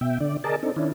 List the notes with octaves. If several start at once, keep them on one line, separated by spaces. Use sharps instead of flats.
B2 E5 G5
D3 D5
G#4 A#4 D5 D#5 A5
C4 D4 D#4 A4
D#3 C#4 D4 E4